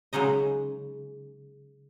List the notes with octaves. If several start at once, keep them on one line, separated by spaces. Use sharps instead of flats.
C#3 F#3 G#3 D#4 D#5